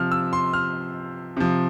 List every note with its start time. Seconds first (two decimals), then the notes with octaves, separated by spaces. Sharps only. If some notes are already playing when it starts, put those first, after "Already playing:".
Already playing: C3 F3 F6
0.12 E6
0.33 C6
0.53 F6
1.37 C3 F3